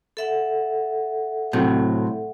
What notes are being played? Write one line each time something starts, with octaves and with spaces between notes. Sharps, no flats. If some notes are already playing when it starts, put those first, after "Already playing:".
A4 E5 F#5
A2 C3 F#3